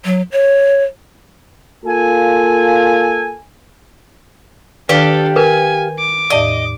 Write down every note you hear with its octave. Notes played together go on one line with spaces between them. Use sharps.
F#3
C#5
A#3 F4 A4 G#5
D#3 D4 G4 A4 B4 F5
A#4 B4 G#5
D6
E2 A2 D5 D#5